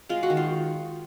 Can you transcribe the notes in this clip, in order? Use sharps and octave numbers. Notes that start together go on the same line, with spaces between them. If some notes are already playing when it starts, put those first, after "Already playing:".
G#3 F4
F#4
D#3
F4